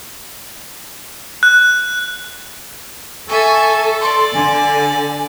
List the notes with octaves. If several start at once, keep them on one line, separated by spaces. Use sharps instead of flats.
F#6
A4 E5 G#5 C#6
D5 C6
D3 G#5